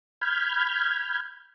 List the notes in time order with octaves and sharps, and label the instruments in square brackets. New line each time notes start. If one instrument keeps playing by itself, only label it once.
[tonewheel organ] B5 F6 G6 G#6